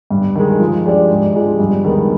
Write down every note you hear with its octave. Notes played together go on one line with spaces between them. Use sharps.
G2
D#3 G#3
F3
G#3 D4 G4 D5
G#2
F3 G#3 D4 G4
G2
D#3 G#3 B3